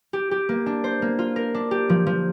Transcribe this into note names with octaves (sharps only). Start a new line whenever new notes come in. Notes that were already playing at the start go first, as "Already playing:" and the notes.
G4
G4
A#3
D4
C5
A#3
F4
A#4
D4
G4
F3
F3